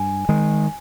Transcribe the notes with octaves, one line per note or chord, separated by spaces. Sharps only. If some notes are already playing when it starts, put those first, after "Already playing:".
Already playing: G2 G#5
D#3 G#3